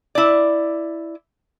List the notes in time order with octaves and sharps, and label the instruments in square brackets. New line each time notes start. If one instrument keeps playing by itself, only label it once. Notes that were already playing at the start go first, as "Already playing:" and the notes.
[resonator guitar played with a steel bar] E4 D5